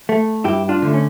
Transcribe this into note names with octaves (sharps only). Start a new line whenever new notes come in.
A3
G2 E4 G4
D4 F4
D3 A3
C#4